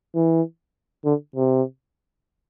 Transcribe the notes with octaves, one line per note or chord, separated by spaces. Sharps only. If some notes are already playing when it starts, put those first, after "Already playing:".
E3
D3
C3